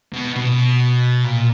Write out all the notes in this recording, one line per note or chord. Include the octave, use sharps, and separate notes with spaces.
B2
B2
A#2